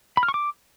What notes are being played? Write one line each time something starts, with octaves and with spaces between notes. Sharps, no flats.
B5
F6
C#6
D6